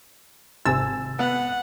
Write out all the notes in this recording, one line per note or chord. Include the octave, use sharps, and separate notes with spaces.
G#1 C3 G#5 E6 A6
B3 F#5